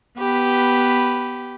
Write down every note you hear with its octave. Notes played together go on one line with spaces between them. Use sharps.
B3 G4 B4